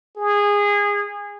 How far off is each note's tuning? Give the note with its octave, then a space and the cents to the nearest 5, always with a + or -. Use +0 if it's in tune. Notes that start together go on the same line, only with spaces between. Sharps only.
G#4 -20